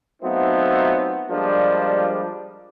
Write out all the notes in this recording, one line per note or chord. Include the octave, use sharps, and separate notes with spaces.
F#3 A3 B3 C4 D#4 F4
F3 G3 G#3 A#3 D4